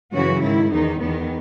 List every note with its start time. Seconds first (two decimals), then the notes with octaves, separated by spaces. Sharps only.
0.12 F#2 C#3 E3 F#4
0.41 G#2 D#3 E4
0.71 E2 D#3 D#4
1.01 E2 D#3 B3